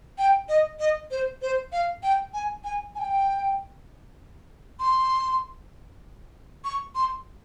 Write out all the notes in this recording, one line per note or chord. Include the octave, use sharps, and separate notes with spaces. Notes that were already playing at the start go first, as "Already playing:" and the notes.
G5
D#5
D#5
C5
C5
F5
G5
G#5
G#5
G#5
G5
C6
C#6
C6